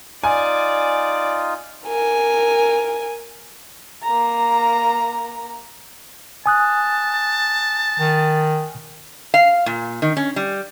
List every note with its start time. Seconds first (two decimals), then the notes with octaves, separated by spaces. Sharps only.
0.24 D#4 F4 D5 G#5
1.86 A#4 G#5
4.03 A#3 A#5
6.46 G#5 A5 D#6 F#6
8.00 D#3
9.34 F5
9.66 A#2
10.02 D#3
10.17 C#4
10.36 G3